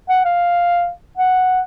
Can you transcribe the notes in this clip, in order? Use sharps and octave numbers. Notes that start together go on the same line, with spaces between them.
F#5
F5
F#5